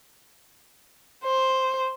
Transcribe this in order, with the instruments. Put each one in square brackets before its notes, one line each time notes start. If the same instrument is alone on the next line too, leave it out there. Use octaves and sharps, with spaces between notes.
[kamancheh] C5